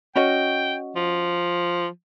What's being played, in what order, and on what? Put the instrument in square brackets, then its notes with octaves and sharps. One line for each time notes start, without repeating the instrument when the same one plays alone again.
[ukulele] C#4 F#4 D#5 [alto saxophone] G5
[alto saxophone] F3